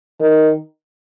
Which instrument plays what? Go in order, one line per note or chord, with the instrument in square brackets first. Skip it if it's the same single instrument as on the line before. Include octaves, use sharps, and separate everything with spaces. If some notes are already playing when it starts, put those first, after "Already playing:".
[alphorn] D#3